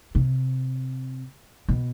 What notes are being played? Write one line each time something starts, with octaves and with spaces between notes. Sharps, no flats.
C3
B2